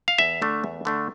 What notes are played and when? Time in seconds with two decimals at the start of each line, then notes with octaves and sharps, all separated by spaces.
0.08 F5
0.19 E2 E5
0.42 D3 A3 D4
0.64 E2
0.85 D3 A3 D4